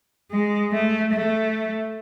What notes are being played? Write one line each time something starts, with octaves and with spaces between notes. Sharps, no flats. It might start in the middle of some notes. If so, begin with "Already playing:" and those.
G#3
A3
A3